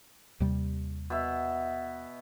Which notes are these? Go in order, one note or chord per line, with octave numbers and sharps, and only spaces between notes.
D#2 C3 G3
B2 E5